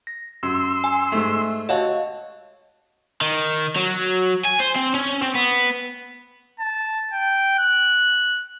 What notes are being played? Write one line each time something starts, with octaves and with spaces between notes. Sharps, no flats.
A#6
F#2 C6 E6
G#5
G#2 A3 E5
F#4 C#5 D#5 F5 A5
D#3
F#3
G#5
C5
C4
C#4
C4
B3
A5
G5
F#6